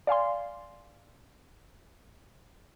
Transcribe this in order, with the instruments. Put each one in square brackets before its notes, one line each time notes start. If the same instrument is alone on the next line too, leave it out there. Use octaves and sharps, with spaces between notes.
[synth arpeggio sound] D5 F5 G#5 C6